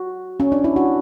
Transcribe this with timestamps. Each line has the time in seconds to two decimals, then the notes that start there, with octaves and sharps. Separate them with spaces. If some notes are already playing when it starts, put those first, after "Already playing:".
Already playing: F#4
0.40 C#4
0.52 D4
0.64 E4
0.76 F#4